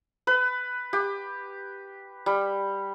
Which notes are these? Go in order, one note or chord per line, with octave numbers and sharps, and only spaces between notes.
B4
G4
G3